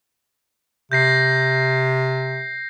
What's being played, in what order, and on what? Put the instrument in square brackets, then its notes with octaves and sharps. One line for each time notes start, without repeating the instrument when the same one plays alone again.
[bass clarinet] C3 [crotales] G6 A#6 C7